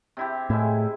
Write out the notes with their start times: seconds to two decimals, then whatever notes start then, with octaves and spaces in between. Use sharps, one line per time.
0.17 C3 E4 G4
0.50 A2 G#3 E4